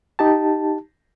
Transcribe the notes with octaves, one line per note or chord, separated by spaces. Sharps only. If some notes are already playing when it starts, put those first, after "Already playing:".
D#4 G4 A5